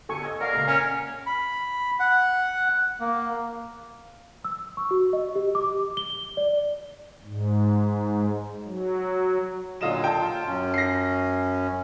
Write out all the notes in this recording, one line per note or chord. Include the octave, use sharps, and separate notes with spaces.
G1 G4 A4 G#5 C#6
D#5 E6 G#6
A4 A#4 D5 F5 F#5
C#2 A#2 C7
C#4 A#4
B5
F#5
A#3
E6
C#6
F#4
D#5
G4
D6
G7
D5
G#2
F#3
A#2 D3 F#3 F4 D#5 E7
G5 A5
F4
F#2 C#4
A#6 C7